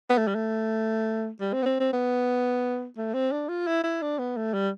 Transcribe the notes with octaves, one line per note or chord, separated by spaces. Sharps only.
B3
A3
G3
A3
G3
C4
B3
C4
C4
B3
A3
C4
D4
F4
E4
E4
D4
B3
A3
G3